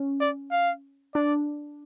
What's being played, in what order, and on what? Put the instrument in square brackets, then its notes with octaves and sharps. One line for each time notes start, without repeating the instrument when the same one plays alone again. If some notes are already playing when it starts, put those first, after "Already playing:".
Already playing: [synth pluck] C#4
[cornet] D5
F5
[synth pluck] D4 [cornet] D5